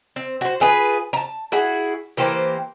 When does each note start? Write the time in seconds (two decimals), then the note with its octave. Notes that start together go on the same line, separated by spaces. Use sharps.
0.16 C4
0.41 F#4 C5
0.60 F4 G#4 B4
1.13 A5 A#5
1.52 E4 F#4 G#4
2.17 E3 A#3 G4 C5